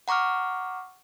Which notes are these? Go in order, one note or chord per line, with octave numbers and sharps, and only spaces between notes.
F#5 A#5 C#6 D6 F6